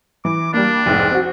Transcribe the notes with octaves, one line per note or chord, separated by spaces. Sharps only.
E3 D6
G3 A#3 D4
F1 C2 G#2
C4 F#4